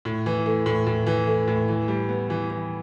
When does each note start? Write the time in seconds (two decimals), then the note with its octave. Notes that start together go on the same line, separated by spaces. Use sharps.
0.05 A2
0.26 E3
0.46 A3
0.66 A2
0.87 A2
1.07 E3
1.27 A3
1.48 A2
1.69 E3
1.88 G3
2.09 B3
2.30 E3
2.50 E3